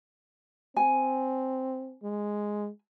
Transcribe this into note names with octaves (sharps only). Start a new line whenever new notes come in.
C4 G#5
G#3